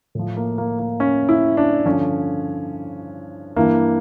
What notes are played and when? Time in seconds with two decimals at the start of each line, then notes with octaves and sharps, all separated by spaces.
0.15 A2 F3
0.37 A#3
0.58 A#3
0.79 A#3
1.00 C#4
1.29 E4
1.57 D4
1.85 G2 D3 F3 C#4
3.56 G2 E3 A#3